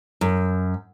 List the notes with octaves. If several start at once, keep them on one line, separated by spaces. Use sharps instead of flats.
F#2